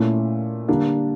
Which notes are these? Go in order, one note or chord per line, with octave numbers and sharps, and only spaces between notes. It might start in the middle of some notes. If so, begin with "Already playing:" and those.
Already playing: A#2 A3 C#4 E4
D3 G3 A#3 D4